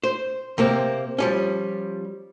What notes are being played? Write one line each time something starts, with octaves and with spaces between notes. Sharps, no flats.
C5
C3 A#3 C4
F3 G3 C#4